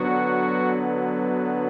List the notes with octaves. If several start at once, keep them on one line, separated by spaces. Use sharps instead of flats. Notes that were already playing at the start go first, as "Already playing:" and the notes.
Already playing: D3 F#3 B3 F#4